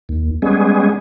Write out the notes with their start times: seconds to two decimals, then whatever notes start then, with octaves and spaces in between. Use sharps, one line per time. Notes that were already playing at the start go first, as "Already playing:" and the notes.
0.09 D#2
0.42 G3 G#3 B3 C#4 G#4